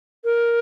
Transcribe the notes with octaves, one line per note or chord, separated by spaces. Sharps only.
A#4